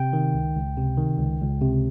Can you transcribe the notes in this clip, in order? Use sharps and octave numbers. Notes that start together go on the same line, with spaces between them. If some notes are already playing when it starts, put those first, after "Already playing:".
Already playing: C3 G5
D#3
C#2
C#2
C3
D#3
C#2
C#2
C3